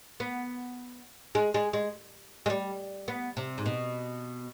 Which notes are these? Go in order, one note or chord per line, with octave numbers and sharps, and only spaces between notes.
B3
G#3
G#3
G#3
G#3
G3
B3
C3
G#2
B2